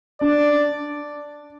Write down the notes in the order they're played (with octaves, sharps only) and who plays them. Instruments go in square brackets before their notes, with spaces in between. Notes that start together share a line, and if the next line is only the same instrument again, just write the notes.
[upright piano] D4 [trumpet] D5